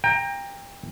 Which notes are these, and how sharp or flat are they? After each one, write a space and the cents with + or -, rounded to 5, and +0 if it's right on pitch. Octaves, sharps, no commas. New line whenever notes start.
G5 +25 A#5 +0